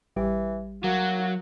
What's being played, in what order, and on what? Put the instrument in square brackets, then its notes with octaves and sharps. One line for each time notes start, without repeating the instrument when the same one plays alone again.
[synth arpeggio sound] A1 G3 G4 [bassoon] E3
[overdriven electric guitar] F#3 [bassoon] A#3 [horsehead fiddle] F#4